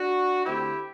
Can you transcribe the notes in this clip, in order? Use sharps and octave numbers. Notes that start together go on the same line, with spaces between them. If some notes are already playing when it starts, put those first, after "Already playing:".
Already playing: D4 F#4
D3 A3 C4 E4 G4